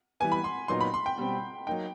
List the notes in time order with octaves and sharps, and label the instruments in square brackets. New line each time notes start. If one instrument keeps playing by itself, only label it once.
[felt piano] E3 G3 B3 [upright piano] G#5
[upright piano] B5
C6
[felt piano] A#2 F#3 B3 D#4 [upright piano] C6
[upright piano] B5
C6
G5
[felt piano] B2 G3 C4
[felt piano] F#3 A#3 D#4 [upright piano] G5